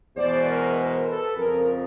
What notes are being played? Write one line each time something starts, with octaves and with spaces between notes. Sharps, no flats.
E2 B2 G#3 C5 D5
A#4 C5
A#4 C5
A4 B4
F2 C#3 F3 G#4 A#4